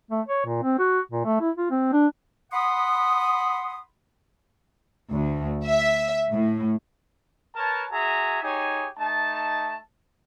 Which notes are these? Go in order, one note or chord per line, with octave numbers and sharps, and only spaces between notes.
A3
C#5
A#2
C4
F#4
A#2
A3
E4
F4
C4
D4
F#5 B5 C6 D#6
D2
E5
A2
A#4 B4 C#5 A5
F#4 G#4 E5 G#5 A#5
D#4 G4 G#4 C#5 G#5
A3 D#4 A5